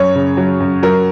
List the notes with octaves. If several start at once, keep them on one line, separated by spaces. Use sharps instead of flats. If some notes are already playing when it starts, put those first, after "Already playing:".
Already playing: F#2 C#5
C#3
F#3
F#2
F#3 A#4